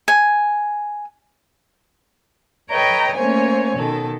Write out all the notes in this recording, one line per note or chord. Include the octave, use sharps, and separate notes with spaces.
G#5
A4 B4 C#5 D#5 G5 A#5
A3 A#3 C#4 C5 C#5 G#5
B2 D#3 A4